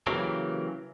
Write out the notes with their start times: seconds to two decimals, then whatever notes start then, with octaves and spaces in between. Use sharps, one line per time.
0.07 C#3 E3 F#3 A#3 G4